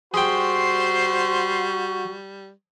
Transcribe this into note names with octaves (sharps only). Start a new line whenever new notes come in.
G3 F#4 G#4 C5 G5 C6